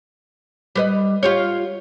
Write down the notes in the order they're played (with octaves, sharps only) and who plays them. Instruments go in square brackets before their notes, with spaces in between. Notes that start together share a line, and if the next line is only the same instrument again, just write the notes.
[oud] G3 B4 D#5
F4 G4 C#5